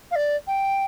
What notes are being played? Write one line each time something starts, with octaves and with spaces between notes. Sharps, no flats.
F5
D5
G5